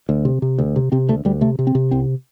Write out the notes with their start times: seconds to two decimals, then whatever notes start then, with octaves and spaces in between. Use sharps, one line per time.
0.09 D2
0.25 C3
0.42 C3
0.58 D2
0.76 C3
0.92 C3 C4
1.09 D2 A3
1.25 D2 G3
1.41 C3 A3
1.59 C3
1.67 C4
1.75 C3
1.91 C2 C4